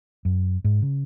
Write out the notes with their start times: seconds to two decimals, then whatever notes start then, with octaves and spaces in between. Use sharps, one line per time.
0.25 F#2
0.64 G#2
0.82 C#3